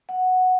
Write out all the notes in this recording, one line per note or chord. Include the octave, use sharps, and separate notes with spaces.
F#5